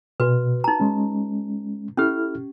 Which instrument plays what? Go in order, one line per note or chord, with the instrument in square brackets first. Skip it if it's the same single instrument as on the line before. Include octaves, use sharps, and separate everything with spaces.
[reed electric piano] B2 [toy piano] F#4 B4
[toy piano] D#4 A#5
[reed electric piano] G#3 C#4
[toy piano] C#4 G4 [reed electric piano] E4 A4 F6